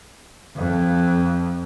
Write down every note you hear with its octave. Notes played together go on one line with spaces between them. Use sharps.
F2